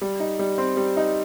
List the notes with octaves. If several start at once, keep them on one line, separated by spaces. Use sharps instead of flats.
G3
D#4
G3
C4
G3
D#4